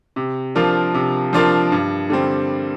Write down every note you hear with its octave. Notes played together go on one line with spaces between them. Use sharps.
C3
F3 D4 F4 A#4
C3
F3 D4 F4 A#4
G2
D3 G3 C4